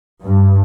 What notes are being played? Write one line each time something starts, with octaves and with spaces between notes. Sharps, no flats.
G2